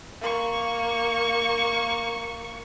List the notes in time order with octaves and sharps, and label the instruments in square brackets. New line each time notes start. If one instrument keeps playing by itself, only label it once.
[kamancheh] A#3 C#6